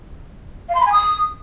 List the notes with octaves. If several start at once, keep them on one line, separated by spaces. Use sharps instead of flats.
F5
C6
B5
G#5
D#6